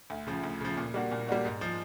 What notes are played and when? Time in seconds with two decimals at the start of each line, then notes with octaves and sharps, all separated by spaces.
0.10 D2
0.27 C#3 F3
0.44 D2
0.61 C#3 F3
0.77 A#2
0.94 G3 A#3 D4 F#4
1.12 A#2
1.28 G3 A#3 D4 F#4
1.45 G#2
1.61 F3 G#3